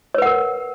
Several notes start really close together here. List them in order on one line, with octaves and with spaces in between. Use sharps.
C#5 B4 F#5 A#4